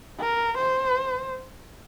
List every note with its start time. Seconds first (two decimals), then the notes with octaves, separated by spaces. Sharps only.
0.20 A#4
0.58 C5